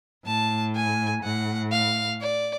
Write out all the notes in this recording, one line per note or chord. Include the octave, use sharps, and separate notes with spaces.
A2 A5
G#5
A2 F#5
F5
D5